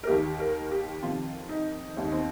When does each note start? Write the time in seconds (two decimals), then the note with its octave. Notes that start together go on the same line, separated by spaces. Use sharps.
0.03 A#4
0.07 D#2 D#3 G4
0.40 A#4
0.71 G4
1.02 F2 C3 D#3 F4
1.49 D#4
1.96 D#2 D#3 C4
2.05 D#4
2.12 C4